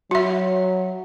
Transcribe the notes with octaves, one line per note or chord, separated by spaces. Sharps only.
F#3 F#4 E5